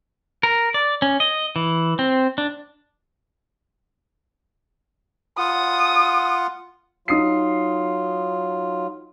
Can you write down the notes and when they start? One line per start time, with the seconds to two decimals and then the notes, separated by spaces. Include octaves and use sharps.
0.43 A#4
0.74 D5
1.02 C#4
1.20 D#5
1.56 E3
1.99 C4
2.38 D4
5.38 F4 F#5 D#6
7.08 F#3 D#4 F4 D#6 C7